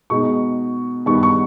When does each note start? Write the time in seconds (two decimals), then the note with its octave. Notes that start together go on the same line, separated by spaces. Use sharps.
0.10 B2 G#3 D#4 C#6
1.06 G2 D#3 G3 B3 D#4 C#6
1.23 C#6